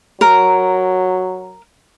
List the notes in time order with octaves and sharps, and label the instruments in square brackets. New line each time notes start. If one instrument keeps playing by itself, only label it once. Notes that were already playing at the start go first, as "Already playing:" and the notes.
[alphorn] F#3 [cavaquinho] A#4